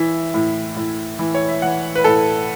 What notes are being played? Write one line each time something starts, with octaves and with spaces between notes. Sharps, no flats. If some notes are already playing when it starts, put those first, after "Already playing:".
Already playing: E3 E5
A2
A2
E3
C#5
E5
E3 F#5
B4
A2 A4